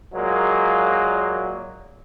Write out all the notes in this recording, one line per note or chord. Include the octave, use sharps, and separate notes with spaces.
A#2 F#3 G#3 A#3